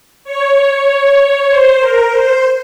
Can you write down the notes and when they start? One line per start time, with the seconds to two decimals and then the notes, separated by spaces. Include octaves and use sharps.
0.24 C#5
1.49 C5
1.80 A#4
2.11 C5